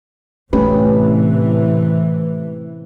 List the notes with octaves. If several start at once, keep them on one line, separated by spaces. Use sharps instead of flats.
A2 C3 E3 A3 C#4 G4 B4